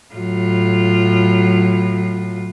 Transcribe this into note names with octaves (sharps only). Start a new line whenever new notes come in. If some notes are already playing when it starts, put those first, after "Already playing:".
A2 F#3 F4